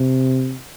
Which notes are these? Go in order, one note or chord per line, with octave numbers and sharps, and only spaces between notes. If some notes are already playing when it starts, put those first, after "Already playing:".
Already playing: C3